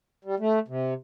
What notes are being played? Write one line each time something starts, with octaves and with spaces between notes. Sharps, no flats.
G3
A3
C3